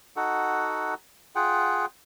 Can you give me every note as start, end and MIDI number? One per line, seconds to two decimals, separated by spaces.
0.16 0.94 63
0.16 0.94 66
0.16 0.94 69
0.16 0.94 78
1.36 1.86 65
1.36 1.86 68
1.36 1.86 78
1.36 1.86 79